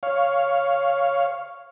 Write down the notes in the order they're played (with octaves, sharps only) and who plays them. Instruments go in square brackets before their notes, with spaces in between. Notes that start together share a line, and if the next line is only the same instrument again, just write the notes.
[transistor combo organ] C#5 F5